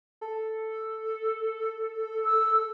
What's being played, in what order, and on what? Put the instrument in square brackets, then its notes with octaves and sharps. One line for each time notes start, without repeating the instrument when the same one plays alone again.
[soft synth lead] A4
[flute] E6